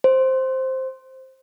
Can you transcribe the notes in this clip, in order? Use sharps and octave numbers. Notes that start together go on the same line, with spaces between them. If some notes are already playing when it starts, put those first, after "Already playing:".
C5